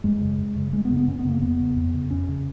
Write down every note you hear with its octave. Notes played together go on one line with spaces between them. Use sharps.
F#2 G#3
C#3
F#2
C#3
F#2 G#3
B3
C#3
B3
F#2 C#4
B3
C#3
A#3
F2 B3
C#3
F2
C#3
F2 C#4
C#3